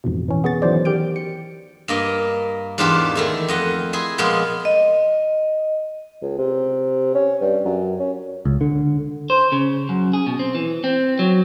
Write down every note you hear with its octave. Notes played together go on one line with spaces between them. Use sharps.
A1 F2 G#2 B2
E3 C#4
B3 G#4 C#6 A6
D#3 E3 F#3 C5 D5
D#3 G4 F6 G6 D7
C#7
G2 A#3 D#5
E2 G#2 D4 F4 G4 C5
D#3 A3 E4
F2 D#5 F#5
E4 G#4 G#5 C6
A#2 F3 G#3 B3
D#5
C#2
C3
C#4
G2
F#2
C#4
C#2
D3
C5
C#3
F#2
G#4
B2
C4
E3
C4
F#3